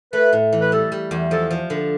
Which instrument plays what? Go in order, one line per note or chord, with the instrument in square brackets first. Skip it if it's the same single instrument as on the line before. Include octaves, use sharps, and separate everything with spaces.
[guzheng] A3 [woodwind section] B4
[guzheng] A2
E3
[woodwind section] B4
[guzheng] G3 [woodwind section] A4
[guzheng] G3
E2
[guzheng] F3 [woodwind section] A4
[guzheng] F3
D3